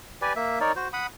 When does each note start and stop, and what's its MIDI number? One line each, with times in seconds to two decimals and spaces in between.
0.22 0.33 67
0.22 0.33 71
0.22 0.33 74
0.22 0.33 80
0.36 0.59 58
0.36 0.59 76
0.61 0.72 63
0.61 0.72 70
0.61 0.72 73
0.61 0.72 74
0.76 0.88 66
0.76 0.88 72
0.93 1.07 78
0.93 1.07 83
0.93 1.07 87